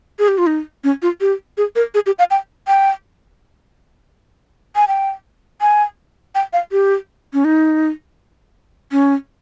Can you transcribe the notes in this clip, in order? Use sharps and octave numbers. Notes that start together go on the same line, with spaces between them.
G#4
G4
F4
D#4
C#4
F4
G4
G#4
A#4
G#4
G4
F5
G5
G5
G#5
G5
G#5
G5
F5
G4
C#4
D#4
C#4